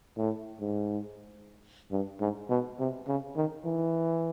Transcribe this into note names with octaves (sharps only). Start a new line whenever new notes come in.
A2
G#2
G2
G#2
B2
C3
C#3
D#3
E3